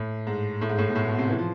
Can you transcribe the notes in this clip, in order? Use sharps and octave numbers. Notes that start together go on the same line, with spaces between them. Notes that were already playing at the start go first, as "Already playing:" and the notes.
Already playing: A2
G#2
A2
G#2
A2
B2
A2
B2
C3
E3
F3